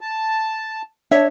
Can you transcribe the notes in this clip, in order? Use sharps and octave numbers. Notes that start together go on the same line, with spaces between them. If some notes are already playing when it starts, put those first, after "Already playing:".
A5
D4 C#5 E5